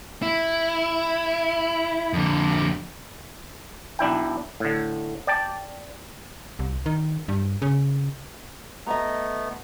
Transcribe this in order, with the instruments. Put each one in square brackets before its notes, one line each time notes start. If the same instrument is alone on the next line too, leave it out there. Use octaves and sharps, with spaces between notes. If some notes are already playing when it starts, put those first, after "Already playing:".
[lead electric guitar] E4
F2 D3
[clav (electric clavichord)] B1 D4 E4 G5
A2 D3
D5 G5 A5
[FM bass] C2
D#3
G2
C#3
[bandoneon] A3 B3 [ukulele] D#5 A#5